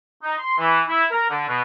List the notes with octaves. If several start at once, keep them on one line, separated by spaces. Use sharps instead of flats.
D#4
C6
E3
E4
A#4
D3
B2